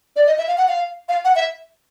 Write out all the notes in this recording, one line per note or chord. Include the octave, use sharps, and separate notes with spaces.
D5
D#5
E5
F5
F#5
F5
F5
F#5
E5